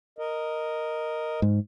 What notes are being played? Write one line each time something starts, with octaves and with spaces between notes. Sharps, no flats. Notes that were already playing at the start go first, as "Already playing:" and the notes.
A#4 D#5
G#2